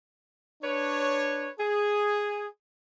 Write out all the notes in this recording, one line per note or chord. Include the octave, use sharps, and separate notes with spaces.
D4 B4 C#5
G#4